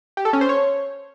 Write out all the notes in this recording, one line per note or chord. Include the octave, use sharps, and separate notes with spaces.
G4
A4
C#4
C5
C#5